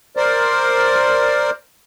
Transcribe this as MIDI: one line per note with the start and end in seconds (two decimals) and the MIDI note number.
0.17 1.50 70
0.17 1.50 72
0.17 1.50 74